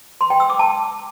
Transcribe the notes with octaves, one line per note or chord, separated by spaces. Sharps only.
C6
G5
E6
D6
A5